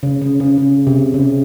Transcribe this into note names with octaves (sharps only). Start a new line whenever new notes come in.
C#3
C#3
C#3
C#3
C3
C#3